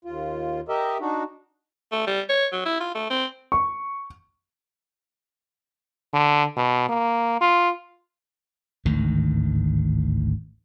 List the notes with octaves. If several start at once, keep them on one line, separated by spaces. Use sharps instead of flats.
D#2 F4
G4 A#4 D#5 E5
D4 D#4 F#4
A3
G3
C#5
F#3
E4
F4
A3
C4
C#6
D3
B2
A#3
F4
G#1 D2 A2 D#3